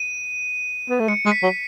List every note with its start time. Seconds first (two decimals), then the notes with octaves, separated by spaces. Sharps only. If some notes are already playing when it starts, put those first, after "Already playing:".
Already playing: D#7
0.90 B3
1.00 A3
1.08 G#3 C#7
1.25 G#3
1.32 B6
1.43 F#3